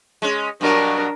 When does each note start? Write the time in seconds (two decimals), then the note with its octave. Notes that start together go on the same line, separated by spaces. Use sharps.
0.22 G#3 C#4
0.61 G2 B2 F#3 D4 A#4